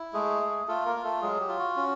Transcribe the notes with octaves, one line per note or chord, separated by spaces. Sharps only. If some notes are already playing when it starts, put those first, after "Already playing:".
Already playing: E4
G#3 A3 G#4
A3
A3 F4 A4
A#3 A#4
F4
A3 A4
F#3 G#3 G#4
G4
F4
F#4
C#4